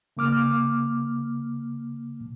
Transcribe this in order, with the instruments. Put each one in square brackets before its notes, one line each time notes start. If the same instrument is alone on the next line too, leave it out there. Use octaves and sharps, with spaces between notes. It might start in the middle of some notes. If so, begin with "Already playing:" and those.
[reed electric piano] C#3 A#3 D6 F6